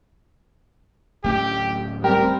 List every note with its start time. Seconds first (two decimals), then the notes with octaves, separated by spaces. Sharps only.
1.24 D1 A3 C#4 G4
2.04 G3 C4 G4 A#4